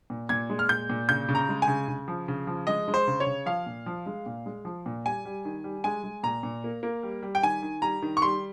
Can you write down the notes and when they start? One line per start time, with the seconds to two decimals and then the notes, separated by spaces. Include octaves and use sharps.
0.10 A#2
0.29 A#2 G#6
0.50 G#3
0.59 F6
0.69 A#2 G6
0.90 A#2
1.09 C#3 G6
1.29 C#3
1.35 A#5
1.49 G#3
1.62 G#5
1.68 C#3
1.88 C#3
2.08 F3
2.28 C#3
2.47 F3
2.67 G#3 D#5
2.88 G#3
2.94 C5
3.07 C#3
3.20 C#5
3.26 C#3
3.46 F3 F5
3.66 A#2
3.86 F3
4.06 G#3
4.26 A#2
4.46 G#3
4.65 F3
4.86 A#2
5.06 G3 G#5
5.25 G3
5.45 D#3
5.64 G3
5.84 G#3 G#5
6.04 G#3
6.23 A#2 A#5
6.43 A#2
6.64 A#3
6.83 A#3
7.03 G3
7.23 G3
7.35 G5
7.43 D#3 G#5
7.62 D#3
7.82 G3 A#5
8.02 D#3
8.17 C#6
8.22 G3 C6